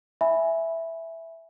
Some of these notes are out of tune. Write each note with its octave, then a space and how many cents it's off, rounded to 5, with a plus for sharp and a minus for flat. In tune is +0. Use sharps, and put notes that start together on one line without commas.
E5 +0 G#5 +0 B5 +0